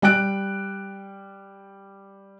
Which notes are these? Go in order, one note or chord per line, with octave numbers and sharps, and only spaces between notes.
G3 G5 F#6 D7